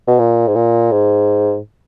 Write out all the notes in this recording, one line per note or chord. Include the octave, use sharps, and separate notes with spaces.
B2
A#2
G#2
A#2
G#2